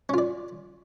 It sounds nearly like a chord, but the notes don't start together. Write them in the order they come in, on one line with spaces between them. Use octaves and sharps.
C#4 F4 D5